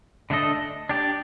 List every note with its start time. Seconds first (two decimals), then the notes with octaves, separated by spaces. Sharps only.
0.30 D3 A3 D4 A4 D#5
0.89 D4 G4 D5